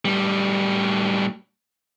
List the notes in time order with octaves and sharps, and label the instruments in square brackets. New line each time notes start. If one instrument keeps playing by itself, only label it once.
[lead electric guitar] A2 G3